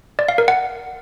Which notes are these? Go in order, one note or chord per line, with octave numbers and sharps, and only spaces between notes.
D5
F5
A#4
F#5